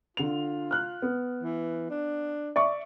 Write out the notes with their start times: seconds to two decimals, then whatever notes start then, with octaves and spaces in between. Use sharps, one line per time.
0.17 D3 F4 F7
0.71 F6 F#6
1.02 B3
1.43 E3
1.90 D4
2.56 D5 E5 C#6